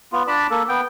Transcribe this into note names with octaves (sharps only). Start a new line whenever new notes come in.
B3 F4
D4 D5 A5 B5
A#3 A4
B3 G5